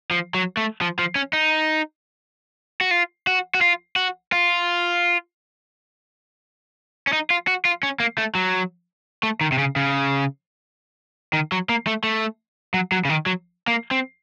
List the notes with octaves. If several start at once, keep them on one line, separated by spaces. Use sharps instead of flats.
F3
F#3
A3
F3
F3
C#4
D#4
F#4
F4
F#4
F#4
F4
F#4
F4
C#4
D#4
F4
F#4
F4
C#4
A#3
A3
F#3
A3
D#3
C3
C#3
C#3
D#3
F#3
A#3
A3
A3
F#3
F#3
C#3
D#3
F#3
A#3
C4